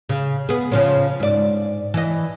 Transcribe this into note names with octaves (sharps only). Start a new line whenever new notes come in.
C#3
B3 G#4
C#3 F3 C#4
G#2 D5
E3 D#5